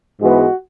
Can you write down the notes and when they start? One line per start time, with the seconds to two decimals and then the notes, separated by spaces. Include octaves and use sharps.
0.21 G#2 E3 G#3 B3 F#4